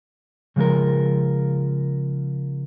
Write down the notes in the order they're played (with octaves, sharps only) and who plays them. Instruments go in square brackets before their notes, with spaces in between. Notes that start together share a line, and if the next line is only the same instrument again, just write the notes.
[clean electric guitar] C#3 F3 G#3 F4 A#4